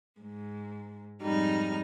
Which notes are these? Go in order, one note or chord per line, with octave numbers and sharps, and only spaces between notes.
G#2
F2 G#2 G3 D#4 F6